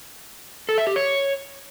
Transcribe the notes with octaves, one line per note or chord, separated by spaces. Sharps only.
A4
E5
G4
C#5